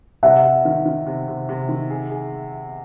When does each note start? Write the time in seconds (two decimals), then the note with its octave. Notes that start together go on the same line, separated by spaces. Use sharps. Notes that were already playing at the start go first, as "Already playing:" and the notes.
0.23 C3 E5 F#5
0.43 C3
0.65 D#3
0.86 D#3
1.07 C3
1.28 C3
1.49 C3
1.69 D#3
1.90 G#4
2.10 G#4